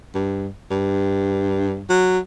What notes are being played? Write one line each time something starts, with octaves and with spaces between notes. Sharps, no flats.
G2
G2
F#3